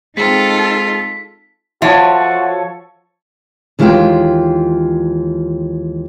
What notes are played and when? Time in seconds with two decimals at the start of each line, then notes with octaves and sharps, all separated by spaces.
0.17 G#3 C4 D#4 F4 A4 B6
1.82 F3 F#4 A4 C#5 E5
3.79 D#2 E3 G#3 F4 G4 G5